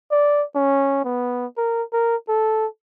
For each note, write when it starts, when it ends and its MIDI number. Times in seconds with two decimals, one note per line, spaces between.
0.11 0.43 74
0.55 1.03 61
1.04 1.46 59
1.57 1.82 70
1.93 2.16 70
2.28 2.66 69